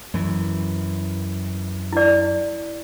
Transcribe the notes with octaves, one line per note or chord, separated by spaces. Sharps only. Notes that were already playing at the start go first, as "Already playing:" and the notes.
F#2 E3
E4 D5